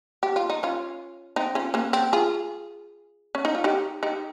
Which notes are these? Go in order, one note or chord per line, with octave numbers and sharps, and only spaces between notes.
G4
F4
D#4
C#4 F4
C4 D#4
C#4 F4
A#3 C#4
C4
F4 G#4
C#4
D#4
F4
D#4 G4
D#4 G4